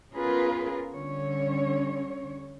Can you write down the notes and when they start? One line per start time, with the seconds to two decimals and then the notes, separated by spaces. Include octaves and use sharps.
0.14 B3 C#4 F4 G#4 A#4 B4
0.94 D3 G3 C#4 C#5